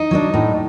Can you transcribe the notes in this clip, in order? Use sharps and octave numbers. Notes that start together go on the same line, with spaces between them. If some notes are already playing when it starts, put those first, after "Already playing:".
Already playing: D#4
F#3 B3 D4
A2